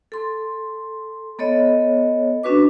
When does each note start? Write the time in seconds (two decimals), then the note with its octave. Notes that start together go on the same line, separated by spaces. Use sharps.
0.12 A4 C6
1.39 B3 A4 C#5 D#5
2.43 C#4 D4 F#4 B4 D6